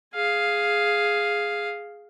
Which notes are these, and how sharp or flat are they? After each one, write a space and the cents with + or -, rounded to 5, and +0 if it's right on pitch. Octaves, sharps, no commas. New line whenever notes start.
G#4 +0 F5 +0